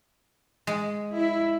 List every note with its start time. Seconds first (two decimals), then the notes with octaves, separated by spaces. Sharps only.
0.67 G#3
1.16 E4